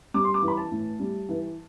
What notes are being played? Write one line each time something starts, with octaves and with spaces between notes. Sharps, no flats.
G3 D6
C6
D6
E3
B5
A5
A2
G3
E3